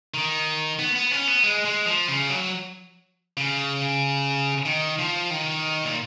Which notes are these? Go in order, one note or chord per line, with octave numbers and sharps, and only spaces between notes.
D#3
B3
B3
C#4
B3
G#3
G#3
F3
C#3
F#3
C#3
D#3
F3
D#3
A#2